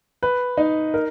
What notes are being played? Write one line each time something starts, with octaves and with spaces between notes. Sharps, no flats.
B4
D#4
A#4